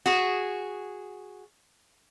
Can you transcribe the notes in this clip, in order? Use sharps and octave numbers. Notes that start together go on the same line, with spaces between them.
F#4 G#4